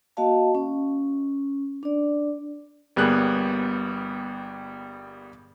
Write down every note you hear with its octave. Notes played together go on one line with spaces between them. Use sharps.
A#3 F#4 D#5 F5 A5
C#4
D4 D5
G1 G3 A#3 B3 G#4 F#6